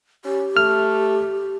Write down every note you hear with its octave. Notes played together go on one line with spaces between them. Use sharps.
C#4 G4
A3 F6